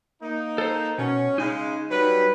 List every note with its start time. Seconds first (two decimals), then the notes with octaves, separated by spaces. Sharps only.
0.21 A#3 D#4
0.58 A4 C5
0.98 B2 C#4
1.38 C#3 G#3 D#4
1.90 F#3 G3 B4